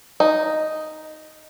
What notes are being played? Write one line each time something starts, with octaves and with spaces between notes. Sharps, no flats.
D#4